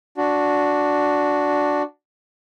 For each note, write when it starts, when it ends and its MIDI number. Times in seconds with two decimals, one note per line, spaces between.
0.17 1.82 62
0.17 1.82 66